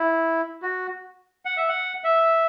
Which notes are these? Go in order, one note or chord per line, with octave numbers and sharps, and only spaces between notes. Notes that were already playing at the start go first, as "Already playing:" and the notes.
Already playing: E4
F#4
F#5
E5
F#5
E5